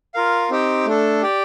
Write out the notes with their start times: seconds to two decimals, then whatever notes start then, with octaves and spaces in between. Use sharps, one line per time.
0.14 F4 A#4 F5
0.50 C4 D#4 G4 C5 G5
0.86 A3 D4 A4
1.22 G4 D5 G5